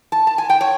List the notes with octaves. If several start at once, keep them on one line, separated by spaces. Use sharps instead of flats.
A5
A5
G#5
G5
C#5